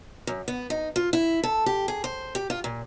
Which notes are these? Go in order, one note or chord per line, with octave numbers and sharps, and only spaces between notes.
F#2
B3
D#4
F4
E4
A4
G4
G#4
C5
G4
F4
A#2